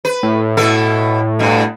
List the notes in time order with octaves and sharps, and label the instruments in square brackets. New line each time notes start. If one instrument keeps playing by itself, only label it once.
[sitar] B4
[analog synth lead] A2
[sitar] B2 E4 A4
G2 B2